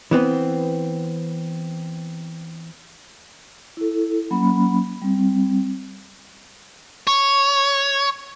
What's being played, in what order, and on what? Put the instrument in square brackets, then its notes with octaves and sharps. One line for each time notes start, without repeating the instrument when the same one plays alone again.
[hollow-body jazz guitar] E3 B3 C4
[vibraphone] E4 A4
F#3 A#3 C#4 B5
G3 C4
[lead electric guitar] C#5